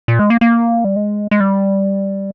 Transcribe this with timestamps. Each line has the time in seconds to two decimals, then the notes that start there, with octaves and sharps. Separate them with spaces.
0.08 A#2
0.19 G#3
0.30 A#3
0.41 A#3
0.84 G3
0.96 G#3
1.31 G#3
1.40 G3